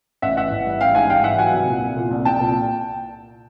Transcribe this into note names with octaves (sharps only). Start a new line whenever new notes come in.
A1 E5 F#5
E3 E5 F#5
A1
G3
A1 F5 G5
G#2 F#5 G#5
G3 F5 G5
E3 E5 F#5
F#3 F#5 G#5
C2
A#2
C2
A#2
C2
C2 G5 A5
A#2